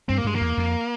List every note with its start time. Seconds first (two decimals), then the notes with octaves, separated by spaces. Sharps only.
0.09 G2 C4
0.18 A#3
0.24 G2 G#3
0.35 A#3
0.41 E2
0.57 F2